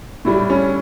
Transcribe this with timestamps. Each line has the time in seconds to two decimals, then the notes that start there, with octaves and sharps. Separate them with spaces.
0.25 A2 G3 E4
0.50 C#4